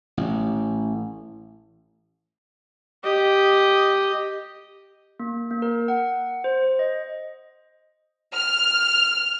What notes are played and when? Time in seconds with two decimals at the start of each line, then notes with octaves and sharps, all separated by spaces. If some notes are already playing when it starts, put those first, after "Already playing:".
0.17 A1
3.04 G4 D#5
5.20 A#3
5.51 A#3
5.62 A#4
5.88 F#5
6.44 C5
6.79 D#5
8.35 F6